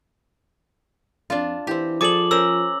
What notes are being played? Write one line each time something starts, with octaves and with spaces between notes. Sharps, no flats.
F2 D4 F4
E3 C4 G4
F3 G#4 A4 D5 D6 F#7
C#4 A#4 C5 E6